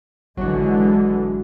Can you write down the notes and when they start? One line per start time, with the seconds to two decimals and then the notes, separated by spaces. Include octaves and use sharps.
0.37 G#1 D3 E3 F#3 G#3 D4 F#4